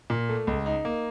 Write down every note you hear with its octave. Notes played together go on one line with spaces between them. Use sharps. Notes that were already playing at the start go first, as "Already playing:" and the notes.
A#2
A3
C#2
D#4
A#3